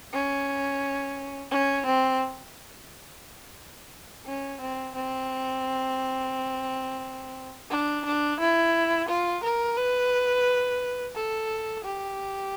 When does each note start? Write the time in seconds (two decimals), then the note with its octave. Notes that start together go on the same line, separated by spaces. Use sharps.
0.13 C#4
1.51 C#4
1.86 C4
4.26 C#4
4.61 C4
4.95 C4
7.71 D4
8.05 D4
8.40 E4
9.08 F4
9.43 A#4
9.77 B4
11.15 A4
11.84 G4